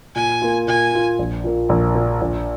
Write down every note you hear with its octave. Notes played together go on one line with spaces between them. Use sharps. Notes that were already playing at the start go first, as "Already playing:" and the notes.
A#2 G#5
A#3 F4
A#2 G#5
A#3 F4
A#1
A#2 A#3
A#1
A#2 A#3
A#1